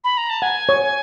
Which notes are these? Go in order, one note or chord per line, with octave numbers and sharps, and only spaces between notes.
B5
A#5
A5
F#5 G#5
C#5